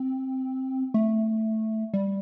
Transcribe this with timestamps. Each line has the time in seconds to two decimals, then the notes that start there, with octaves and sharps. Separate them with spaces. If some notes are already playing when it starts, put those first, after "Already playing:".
Already playing: C4
0.94 A3
1.94 G3